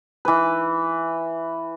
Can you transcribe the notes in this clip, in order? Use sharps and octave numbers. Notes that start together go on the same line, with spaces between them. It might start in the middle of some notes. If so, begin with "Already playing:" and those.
E3 B4